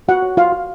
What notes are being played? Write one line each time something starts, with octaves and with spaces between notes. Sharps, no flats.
F4 F#4 F#5
C#5
F4 F5
F4